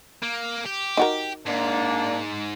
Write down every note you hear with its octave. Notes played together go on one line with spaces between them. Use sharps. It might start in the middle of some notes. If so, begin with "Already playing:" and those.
A#3
G4
D#4 F#4 A#4
G#2 A#3 D4